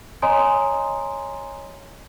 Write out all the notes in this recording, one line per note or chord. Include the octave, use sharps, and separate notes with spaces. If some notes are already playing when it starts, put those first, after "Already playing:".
C#5 D#5 G#5 A#5 C6 D#6